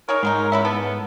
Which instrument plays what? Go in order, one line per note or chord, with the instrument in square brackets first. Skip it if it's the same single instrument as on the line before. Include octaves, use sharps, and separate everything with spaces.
[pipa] D#4 G#4 C#5 [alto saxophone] A#4
[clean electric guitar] G#2 [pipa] F#3 G#3 D#4
[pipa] C#4 E4 B4 [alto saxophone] E5
[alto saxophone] B3 [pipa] A4